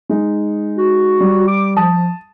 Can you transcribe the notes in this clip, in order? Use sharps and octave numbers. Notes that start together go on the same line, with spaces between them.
G#3 D#4
F#4
G3
D6
F3 A5 D#6